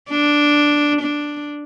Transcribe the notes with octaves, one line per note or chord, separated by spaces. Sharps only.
D4
D4